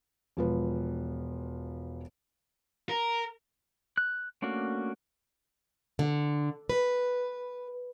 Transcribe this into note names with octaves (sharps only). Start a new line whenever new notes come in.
E1 F3 B4
A#4
F#6
A3 A#3 C#4 D4 F#4
D3
B4